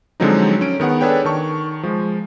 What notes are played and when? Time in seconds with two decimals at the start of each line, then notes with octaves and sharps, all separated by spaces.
0.20 D3 F3 F#3 G#3 C4 D#4
0.61 C#4 D7
0.80 D#3 B3 G#4 F#5
1.01 D4 G#4 A4 B4 C#5 G5
1.25 D#3 A5 C#6
1.83 F3 G#3